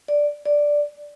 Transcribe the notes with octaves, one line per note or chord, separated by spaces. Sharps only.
D5
D5